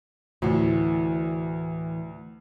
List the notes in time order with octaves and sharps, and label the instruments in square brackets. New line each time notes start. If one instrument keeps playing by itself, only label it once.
[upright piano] D2 [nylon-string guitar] A2 E3